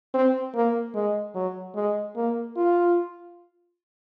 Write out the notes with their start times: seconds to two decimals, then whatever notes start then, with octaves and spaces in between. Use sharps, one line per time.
0.14 C4
0.55 A#3
0.94 G#3
1.35 F#3
1.76 G#3
2.16 A#3
2.56 F4